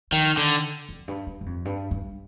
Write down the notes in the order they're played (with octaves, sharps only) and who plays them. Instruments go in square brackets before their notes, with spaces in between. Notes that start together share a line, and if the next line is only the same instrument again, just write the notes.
[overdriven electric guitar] D#3 [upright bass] F3
[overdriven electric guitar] D3 [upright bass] D#3
[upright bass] F2
G2
G2
G2
F2
G2
G2